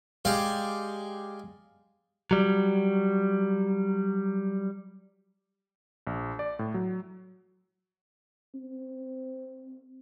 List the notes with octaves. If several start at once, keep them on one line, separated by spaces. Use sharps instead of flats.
G#3 G4 D5 F5
F#3 G3
A#1
D5
A2
F#3
C4